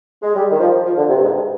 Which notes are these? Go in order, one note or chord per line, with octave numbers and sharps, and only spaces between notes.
G#3
G3
D#3
F3
F3
D3
C3
G2
G#2